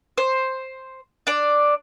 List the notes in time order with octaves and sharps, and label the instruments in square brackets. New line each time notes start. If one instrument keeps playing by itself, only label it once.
[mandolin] C5
D4 D5